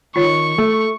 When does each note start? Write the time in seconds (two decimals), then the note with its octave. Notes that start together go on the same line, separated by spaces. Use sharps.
0.16 D#3 F4 C#5 B5 C#6
0.58 A3 A4